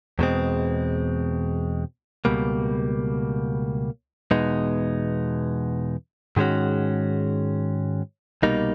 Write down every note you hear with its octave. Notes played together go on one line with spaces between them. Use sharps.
E2 B2 G#3 C4
C#2 B2 G3 A#3
E2 B2 G#3 B3 D#4
G#2 D#3 G#3 C#4 F#4
C2 B2 G3 A#3 D#4